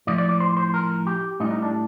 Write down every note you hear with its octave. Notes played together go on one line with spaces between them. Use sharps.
A2 F3 D5
D5
D5
C5
C5
A#4
G4
A2 G3 D#4
D#4
D4